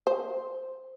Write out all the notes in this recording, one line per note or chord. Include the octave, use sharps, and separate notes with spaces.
C5